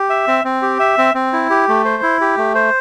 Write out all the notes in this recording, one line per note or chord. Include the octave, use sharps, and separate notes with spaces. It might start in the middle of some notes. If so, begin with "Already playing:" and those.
Already playing: G4
E5
C4
C4
G4
E5
C4
C4
E4
G4
A3
C5
E4
G4
A3
C5